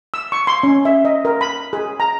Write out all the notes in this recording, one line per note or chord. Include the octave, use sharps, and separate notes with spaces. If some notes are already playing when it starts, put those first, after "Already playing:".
E6
C#6
C6
C#4
E5
D#5
A#4
B5
G#4
A#5